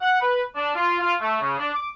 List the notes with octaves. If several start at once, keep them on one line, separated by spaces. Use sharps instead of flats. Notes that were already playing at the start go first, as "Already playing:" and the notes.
F#5
B4
D4
F4
F4
A3
C#3
D4
D6